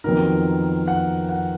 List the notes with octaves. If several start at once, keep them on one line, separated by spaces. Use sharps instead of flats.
F2 D#3 F#3 B3 D#4 A#4
F#5
F#5